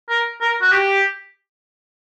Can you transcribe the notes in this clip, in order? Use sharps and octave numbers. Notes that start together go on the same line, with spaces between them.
A#4
A#4
F#4
G4